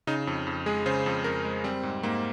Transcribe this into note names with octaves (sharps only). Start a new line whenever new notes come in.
C#3 D#4
F2
F2
G#3 G#4
C#3 C5
F2
F2 A#4
G#3
G3 C4
G#2
G#2 A#3